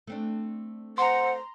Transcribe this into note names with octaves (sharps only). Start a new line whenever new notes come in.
A3 C4 D4
C5 F#5 A#5 C6